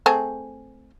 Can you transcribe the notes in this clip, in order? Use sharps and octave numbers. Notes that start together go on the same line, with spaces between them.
A3 C4 G#4